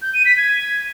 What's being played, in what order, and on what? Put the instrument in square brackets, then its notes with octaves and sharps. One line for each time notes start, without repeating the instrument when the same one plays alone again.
[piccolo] G6
D#7
B6
G#6